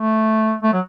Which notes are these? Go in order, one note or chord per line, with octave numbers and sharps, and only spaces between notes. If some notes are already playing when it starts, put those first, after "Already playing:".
Already playing: A3
A3
F#3